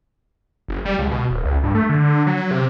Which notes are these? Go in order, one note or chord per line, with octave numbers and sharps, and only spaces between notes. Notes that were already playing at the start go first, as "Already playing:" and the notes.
F#1
G3
C#2
B2
D1
C#2
G2
A3
D3
D3
F#3
C3